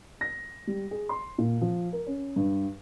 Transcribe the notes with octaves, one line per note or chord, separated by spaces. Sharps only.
A#6
G3
G#4
C6
A#2
F3
A#4
C#4
G2